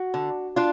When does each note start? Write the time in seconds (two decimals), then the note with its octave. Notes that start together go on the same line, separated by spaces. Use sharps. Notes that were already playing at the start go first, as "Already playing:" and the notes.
Already playing: F#4
0.14 D3
0.56 D4 F4